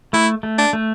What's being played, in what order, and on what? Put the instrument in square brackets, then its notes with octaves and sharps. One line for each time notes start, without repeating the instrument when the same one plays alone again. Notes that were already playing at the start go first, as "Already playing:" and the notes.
[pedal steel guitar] A3 [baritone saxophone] E4
[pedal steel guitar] A3
[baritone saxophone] D4
[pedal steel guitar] A3